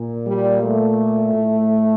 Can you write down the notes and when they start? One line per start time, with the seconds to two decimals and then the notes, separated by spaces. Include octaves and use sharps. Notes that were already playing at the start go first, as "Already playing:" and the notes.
Already playing: A#2
0.27 G3
0.63 A3
1.34 A2